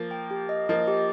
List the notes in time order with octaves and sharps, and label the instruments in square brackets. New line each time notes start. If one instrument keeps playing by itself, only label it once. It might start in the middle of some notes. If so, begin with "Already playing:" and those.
Already playing: [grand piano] F3 A#3
[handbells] G5
G4
D#5
[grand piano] F3 A#3 [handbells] D#5
[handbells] G4